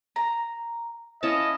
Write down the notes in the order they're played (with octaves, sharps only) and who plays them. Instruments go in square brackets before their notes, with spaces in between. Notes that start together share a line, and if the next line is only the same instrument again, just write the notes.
[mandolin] A#5
[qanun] C#4 E4 A5 [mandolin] F4 [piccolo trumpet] D#5